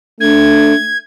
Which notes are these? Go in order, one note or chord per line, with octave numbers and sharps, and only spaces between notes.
A3 D4 G#6